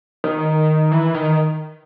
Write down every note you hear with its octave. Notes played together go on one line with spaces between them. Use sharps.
D#3
E3
D#3